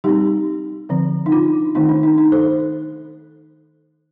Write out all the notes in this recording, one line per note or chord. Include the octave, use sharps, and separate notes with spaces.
G3 C4 D#4 G4
D3 F3 C4
D#4
D4 F4
D#3 A3 C4 D#4
D4
D#4
D#4
A4 C5